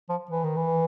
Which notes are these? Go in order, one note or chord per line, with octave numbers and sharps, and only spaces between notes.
F3
E3
D#3
E3